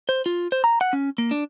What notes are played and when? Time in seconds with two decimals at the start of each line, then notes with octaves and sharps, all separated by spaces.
0.09 C5
0.26 F4
0.52 C5
0.64 A#5
0.81 F#5
0.93 C#4
1.18 A#3
1.31 D4